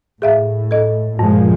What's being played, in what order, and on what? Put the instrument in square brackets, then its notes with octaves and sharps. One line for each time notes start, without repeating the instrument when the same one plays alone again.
[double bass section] A2 [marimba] G#4 E5 F5
[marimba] A4 D#5
[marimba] G2 [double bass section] A#2 F3 G#3